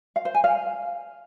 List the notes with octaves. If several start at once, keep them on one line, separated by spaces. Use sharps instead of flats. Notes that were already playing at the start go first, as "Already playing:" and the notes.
F5
C5
G#5
F5